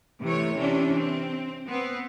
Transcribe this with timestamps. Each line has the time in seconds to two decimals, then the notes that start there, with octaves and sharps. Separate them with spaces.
0.23 C3 E3 A3 C#5
0.56 C3 E3 C#4 D4
0.98 C4
1.68 B3 C4